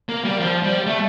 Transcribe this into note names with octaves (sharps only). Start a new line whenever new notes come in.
A#3
G3
F3
G3
A3